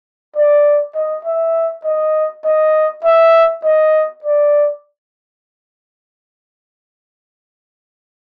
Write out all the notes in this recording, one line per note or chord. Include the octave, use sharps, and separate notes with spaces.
D5
D#5
E5
D#5
D#5
E5
D#5
D5